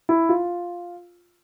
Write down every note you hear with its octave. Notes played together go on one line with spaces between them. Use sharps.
E4
F4